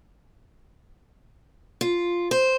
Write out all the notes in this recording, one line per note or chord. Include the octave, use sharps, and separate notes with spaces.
F4
C5